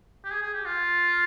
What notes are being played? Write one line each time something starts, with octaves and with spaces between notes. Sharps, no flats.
G4
G#4
G#4
G4
F4